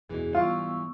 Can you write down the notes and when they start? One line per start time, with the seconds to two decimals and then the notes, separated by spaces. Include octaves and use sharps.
0.09 F#1 E2 G#2 B2 E3 G#4
0.35 G3 B3 F4 C#6 E6